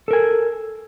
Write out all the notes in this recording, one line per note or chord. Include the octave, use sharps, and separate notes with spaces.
A4 A#4 G#5